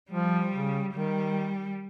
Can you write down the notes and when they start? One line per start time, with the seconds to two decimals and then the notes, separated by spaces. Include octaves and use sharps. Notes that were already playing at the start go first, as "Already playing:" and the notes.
0.11 F3 G3
0.52 C#3
0.94 D#3 G3